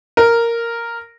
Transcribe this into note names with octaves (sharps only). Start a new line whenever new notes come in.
A#4